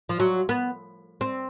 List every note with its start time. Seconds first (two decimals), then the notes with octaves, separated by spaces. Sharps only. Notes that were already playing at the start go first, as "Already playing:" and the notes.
0.09 F3
0.20 F#3
0.49 B3
1.21 C4